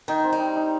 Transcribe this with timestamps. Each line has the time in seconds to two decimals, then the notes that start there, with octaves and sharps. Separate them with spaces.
0.08 D#3 D#4
0.24 C4
0.32 G3
0.40 D#4
0.56 D#4